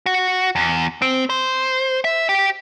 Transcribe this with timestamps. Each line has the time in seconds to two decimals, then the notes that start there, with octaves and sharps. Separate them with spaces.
0.06 F#4
0.56 E2
1.02 C4
1.30 C5
2.04 E5
2.29 G4